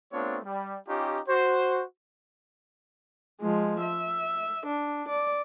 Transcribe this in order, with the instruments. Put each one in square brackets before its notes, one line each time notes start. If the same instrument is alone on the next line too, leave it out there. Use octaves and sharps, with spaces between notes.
[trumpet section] A3 B3 C4 D4 F4 C#5
G3
C#4 D#4 F4 G4
F#4 C5
[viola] F3 G#3
E5
D4
D5